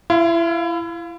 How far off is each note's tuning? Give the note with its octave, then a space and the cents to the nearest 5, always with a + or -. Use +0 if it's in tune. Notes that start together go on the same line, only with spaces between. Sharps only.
E4 +30 F5 +0 C6 -20